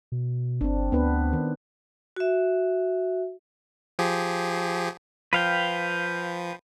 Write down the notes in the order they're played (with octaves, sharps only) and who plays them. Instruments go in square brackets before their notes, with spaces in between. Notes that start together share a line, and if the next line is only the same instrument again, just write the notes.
[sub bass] B2
[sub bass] G1 [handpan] C4 D4
[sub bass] D2 [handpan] B3 D4 B4
[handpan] D#3
[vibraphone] F#4 E5
[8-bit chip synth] F3 G4 G#4
[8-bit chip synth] F3 [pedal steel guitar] B4 F5 G5